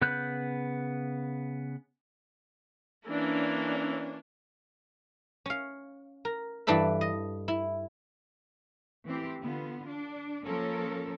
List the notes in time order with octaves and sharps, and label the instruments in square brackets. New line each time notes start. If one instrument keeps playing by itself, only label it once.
[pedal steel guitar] C#3 B3 B5 F#6 G6
[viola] E3 A#3 [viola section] C#4 D4 C#5
[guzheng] C#4 F5
A#4
G2 E3 D4 A4 B4 E5
D#5
E4
[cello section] E3 A3 C4 E4 G4
D3 B3 F4
D4
F3 A#3 C#4 A4 A#4 C#5